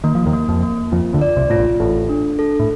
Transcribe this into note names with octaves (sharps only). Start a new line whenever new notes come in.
D#3 A#3
F3
D#2 D#3
A#3
F2 F3
A#3
F2 F3 F4
D2 D3
D5
C2 C3
A2 F4
A#1 A#2
A1 A2 A4
D4
A4
A2